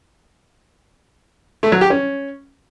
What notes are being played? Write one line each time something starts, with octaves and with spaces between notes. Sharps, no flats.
A3
F#3
G4
C#4